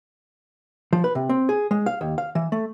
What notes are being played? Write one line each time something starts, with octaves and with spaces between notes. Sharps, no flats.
F3
B4
C3
C4
G#4
G#3
F5
D#2
F5
E3
A3